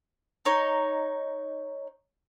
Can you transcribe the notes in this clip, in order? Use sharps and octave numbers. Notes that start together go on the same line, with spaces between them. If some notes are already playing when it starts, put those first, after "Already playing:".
D#4 C#5